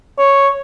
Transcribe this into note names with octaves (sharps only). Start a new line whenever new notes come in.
C#5